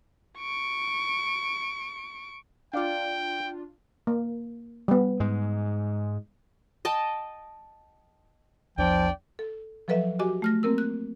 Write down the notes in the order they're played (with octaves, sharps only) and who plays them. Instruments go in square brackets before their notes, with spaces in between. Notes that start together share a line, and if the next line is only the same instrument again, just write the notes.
[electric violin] C#6 D7
[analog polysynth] D4 F4 [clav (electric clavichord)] D5 F5 [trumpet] G5
[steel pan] A#3
G3 B3
[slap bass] G#2 G#3
[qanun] D#5 G5 A5
[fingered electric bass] A#1 E2 D4 [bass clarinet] F3 [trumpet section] D5 G5
[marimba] A4
F3 F#3 A4 B4 D#5 E5
F#4 G4 D#5 G#5 D6
A3 F6 A#6
A#3 C4 A#4 E6
F#6